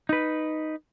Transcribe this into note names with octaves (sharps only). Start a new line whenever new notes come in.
D#4 B4